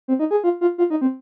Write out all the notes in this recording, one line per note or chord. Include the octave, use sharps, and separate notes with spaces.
C4
D#4
G#4
F4
F4
F4
D#4
C4